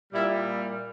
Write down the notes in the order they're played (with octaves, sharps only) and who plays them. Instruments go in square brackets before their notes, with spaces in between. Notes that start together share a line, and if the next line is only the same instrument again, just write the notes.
[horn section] A#2 G3 E4